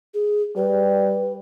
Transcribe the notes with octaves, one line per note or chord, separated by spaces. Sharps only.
G#4
G3 B4